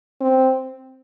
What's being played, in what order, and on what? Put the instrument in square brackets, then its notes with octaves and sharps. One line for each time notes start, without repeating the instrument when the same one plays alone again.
[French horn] C4